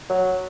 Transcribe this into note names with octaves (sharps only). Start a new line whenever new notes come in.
F#3